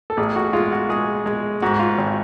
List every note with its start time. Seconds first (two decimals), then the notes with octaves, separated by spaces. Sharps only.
0.10 A4
0.17 A1 G#4
0.36 F#4
0.53 G#3 F4
0.72 F#4
0.89 G#3 G#4
1.26 G#3
1.62 G#2 F#4
1.79 F4
1.98 G#1